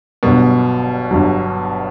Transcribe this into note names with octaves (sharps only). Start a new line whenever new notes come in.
G1 G2 B2 F#3
G1 G2 F#3